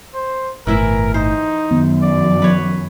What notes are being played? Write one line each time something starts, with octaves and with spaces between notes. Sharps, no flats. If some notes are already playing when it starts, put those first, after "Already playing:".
C5
G1 A2 E3 E4 A#4 E5
D#4 C5
F#2 D#3 B3
D5
B4 C#5